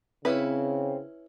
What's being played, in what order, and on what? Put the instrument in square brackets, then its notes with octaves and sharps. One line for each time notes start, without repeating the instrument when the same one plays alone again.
[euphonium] C#3 [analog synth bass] C4 [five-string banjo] C#4 E4 B4